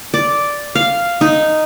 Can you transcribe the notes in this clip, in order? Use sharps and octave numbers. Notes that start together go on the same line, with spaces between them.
D5
F5
D#4